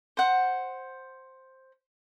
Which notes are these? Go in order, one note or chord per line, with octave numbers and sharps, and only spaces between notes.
C5 F#5